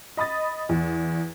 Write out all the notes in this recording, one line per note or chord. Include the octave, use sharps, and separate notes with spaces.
D#5 B5 D#6 A6
E2